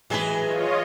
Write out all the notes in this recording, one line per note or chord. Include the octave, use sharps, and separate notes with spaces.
E3 F#3 G#3 G#4 B4
F4 C#5 D#5